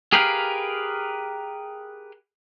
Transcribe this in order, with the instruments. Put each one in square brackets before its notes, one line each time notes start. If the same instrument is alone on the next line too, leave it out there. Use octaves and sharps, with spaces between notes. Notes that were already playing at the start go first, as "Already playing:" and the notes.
[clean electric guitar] G4 G#4 A#4 B4 F5 G5